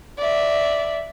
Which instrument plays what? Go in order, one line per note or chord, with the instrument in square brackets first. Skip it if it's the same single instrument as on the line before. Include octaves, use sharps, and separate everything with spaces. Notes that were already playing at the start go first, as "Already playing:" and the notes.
[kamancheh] D5 E5